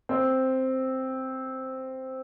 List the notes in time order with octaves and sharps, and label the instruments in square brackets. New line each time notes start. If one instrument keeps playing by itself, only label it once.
[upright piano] C4